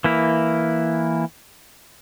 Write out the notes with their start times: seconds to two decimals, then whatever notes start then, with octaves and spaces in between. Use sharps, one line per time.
0.04 E3 A#3 E4